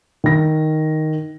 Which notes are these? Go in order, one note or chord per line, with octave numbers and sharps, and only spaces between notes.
D#3 A#6